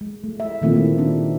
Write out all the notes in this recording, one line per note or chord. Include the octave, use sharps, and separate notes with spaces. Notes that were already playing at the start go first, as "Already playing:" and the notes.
G#3
A3
E5
A#2 D#3 A3 A#3 C4 F4
A3 E4 F4
C4 D4 D#4